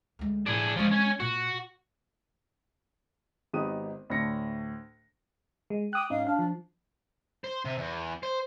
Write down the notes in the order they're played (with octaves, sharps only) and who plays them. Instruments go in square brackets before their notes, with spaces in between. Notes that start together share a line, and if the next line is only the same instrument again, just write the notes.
[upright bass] D2 G#3
[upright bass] A2 [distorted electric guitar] D4 G#4
[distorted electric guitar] F3 C#4 [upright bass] G3 G#3
[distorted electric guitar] C#4 C#5
[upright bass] A#2 [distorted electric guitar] F#4
[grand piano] G#1 B3 D#4 G4 D#6 D#7
D2 A2 D4 A#6 C#7
[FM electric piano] G#3
[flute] G5 [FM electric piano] D6 D#6 F#6
[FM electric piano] G#2 C#4 D#4 [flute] F5
[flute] D4 [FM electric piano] F5
[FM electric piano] F3
[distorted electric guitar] C5
C3
E2
C5